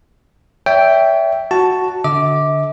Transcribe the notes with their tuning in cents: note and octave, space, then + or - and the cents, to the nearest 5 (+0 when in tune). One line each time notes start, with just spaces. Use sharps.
C#5 +40 E5 +0 G5 +0
F#4 +0 A5 +0
D3 -15 E5 -45 D6 +0